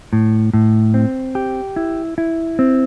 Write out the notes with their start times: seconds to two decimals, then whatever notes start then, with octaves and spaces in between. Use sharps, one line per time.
0.13 A2
0.54 A2
0.94 C4
1.35 G4
1.76 E4
2.18 E4
2.59 C4